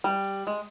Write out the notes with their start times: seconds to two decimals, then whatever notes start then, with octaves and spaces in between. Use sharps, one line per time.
0.04 G3
0.47 G#3